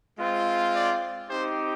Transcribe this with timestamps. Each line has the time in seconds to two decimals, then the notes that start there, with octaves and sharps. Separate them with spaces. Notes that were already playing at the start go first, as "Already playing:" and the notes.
0.18 G#3 C4 F4
0.74 D5
1.28 C4 D#4 G4 C5